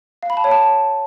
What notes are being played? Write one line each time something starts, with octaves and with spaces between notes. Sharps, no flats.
F5
B5
A5
C#5
A5